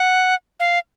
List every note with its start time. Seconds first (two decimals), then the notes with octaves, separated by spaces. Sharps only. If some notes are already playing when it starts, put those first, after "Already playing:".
Already playing: F#5
0.60 F5